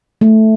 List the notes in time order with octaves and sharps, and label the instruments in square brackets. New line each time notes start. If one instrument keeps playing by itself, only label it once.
[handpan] A3